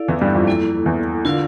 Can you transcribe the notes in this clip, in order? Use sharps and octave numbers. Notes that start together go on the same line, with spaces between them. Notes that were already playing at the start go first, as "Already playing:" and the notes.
Already playing: E4 A4 D5 F5
E2 E3
G2 G3
F2 F3
A#3 E4 A4
E2 E3
D3 F4 A#4 D5 F5